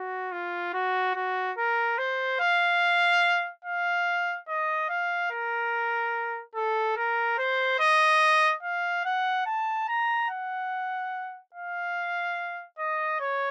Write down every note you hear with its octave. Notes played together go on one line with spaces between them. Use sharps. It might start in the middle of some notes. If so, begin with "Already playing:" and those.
Already playing: F#4
F4
F#4
F#4
A#4
C5
F5
F5
D#5
F5
A#4
A4
A#4
C5
D#5
F5
F#5
A5
A#5
F#5
F5
D#5
C#5